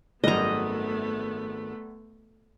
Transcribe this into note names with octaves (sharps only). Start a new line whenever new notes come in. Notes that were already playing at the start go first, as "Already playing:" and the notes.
G#1 F#2 G3 A3 B3 D#5 A#5